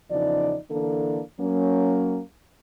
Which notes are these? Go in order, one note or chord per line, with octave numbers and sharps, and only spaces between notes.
E2 C#3 F3 D#4 D5
D3 E3 A#3 D4 A4
F#3 A#3 C#4